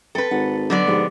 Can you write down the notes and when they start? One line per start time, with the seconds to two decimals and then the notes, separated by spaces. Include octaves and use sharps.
0.15 C4 A4 B4 G5
0.31 G#1 F#5
0.70 D3 F#3 B3 D4 D5
0.87 G#2 F3 G4